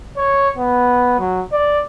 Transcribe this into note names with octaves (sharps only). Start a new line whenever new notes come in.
C#5
B3
F#3
D5